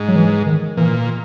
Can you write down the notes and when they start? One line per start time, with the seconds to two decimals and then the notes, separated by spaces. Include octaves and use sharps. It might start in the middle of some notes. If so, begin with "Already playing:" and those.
Already playing: G#2
0.08 F#3
0.16 E3
0.46 D#3
0.77 A#2 E3